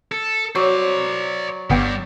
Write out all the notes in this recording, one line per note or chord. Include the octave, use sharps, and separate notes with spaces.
A4
F#3 C5 D5
G1 G2 G3 B3 G5